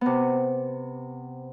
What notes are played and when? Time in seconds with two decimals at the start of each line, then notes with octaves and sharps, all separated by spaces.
0.01 C3 B3